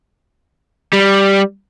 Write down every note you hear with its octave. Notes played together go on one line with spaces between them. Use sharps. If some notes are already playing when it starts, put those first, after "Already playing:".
G3